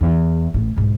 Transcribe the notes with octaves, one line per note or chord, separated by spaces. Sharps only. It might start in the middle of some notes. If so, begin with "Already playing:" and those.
E2
A1 A2
B1 G#2